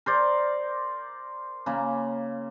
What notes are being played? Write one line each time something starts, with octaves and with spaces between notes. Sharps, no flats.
A#4 C5 D5
C#3 A#3 A#5